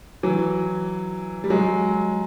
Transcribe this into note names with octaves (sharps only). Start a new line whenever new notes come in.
E3 F#3
G3
F#3 G#3